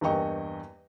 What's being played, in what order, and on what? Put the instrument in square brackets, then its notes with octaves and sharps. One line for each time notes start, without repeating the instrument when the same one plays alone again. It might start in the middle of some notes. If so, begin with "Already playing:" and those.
[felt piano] E2 G2 A#3 D#5 G5 C#6